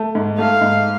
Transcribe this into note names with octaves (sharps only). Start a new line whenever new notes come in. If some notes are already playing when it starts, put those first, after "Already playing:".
Already playing: A3
G#2
A3 F5
G#2